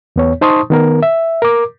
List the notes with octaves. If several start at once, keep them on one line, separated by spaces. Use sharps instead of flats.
E2 B3 C#5
D#4 C5 A5 C6 C#6 D#6
D#3 B3 A#4
E5
A#4 D6